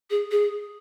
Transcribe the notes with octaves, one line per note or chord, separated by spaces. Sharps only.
G#4
G#4